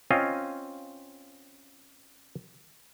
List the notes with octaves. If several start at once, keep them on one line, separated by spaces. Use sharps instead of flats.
C4 C#4 F4 D#5 F5